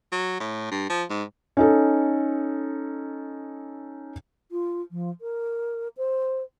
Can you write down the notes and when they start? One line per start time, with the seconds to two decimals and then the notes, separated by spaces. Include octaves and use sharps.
0.12 F#3
0.40 A2
0.71 G2
0.89 F3
1.10 G#2
1.57 C#4 D#4 A4
4.52 F4
4.91 F3
5.21 A#4
5.97 C5